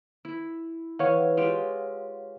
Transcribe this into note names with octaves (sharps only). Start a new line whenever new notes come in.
E4
E3 C#5 F5 F#5
G#3 F4 G4